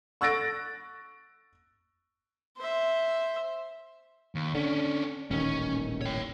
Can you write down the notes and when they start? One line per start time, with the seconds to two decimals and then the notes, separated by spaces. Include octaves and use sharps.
0.21 C#6 E6 F#6 A6 A#6 D7
2.57 C5 E5
4.35 D#2
4.55 D3 C#4 D4
5.31 D#1 A1 D#3 C#4
6.01 C#5 G5